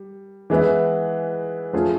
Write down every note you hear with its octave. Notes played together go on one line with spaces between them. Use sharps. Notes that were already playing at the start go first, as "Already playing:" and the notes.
Already playing: G3
E3 G#3 B3 E4
F3 A3 C#4 F4 G#4